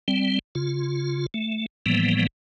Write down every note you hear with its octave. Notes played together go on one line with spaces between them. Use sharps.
G3 C4
C#3 F4
A3
A2 E3 F3 G3 A#3 B3